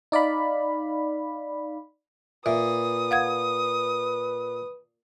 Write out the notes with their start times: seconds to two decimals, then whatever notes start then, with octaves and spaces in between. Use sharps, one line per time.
0.12 D#4 D5 F5 B5
2.46 A#2 B4 E5 D#6
3.11 F5 F#5 G#6